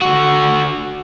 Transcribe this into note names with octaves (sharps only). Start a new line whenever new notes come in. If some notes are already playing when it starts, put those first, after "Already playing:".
D3 F#4